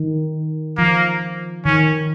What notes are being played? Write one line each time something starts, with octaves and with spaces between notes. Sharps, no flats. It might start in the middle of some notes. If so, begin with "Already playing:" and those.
Already playing: D#3
F3 A#3
D#3 C#4